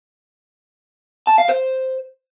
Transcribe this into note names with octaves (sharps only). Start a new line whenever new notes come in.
A5
F5
C5